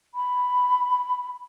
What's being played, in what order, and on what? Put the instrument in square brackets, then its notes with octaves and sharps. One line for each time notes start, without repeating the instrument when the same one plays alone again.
[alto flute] B5